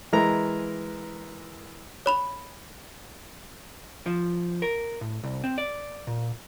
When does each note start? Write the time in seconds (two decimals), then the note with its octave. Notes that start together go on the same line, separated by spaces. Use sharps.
0.13 E3 G#3 A#4 A#5
2.06 C#5 B5 F7
4.06 F3
4.62 A#4
5.01 A2
5.23 C2
5.44 C4
5.58 D5
6.07 A#2